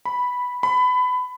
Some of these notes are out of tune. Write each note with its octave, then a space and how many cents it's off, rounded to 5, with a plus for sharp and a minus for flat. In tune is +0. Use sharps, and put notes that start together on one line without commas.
B5 +0
B5 +25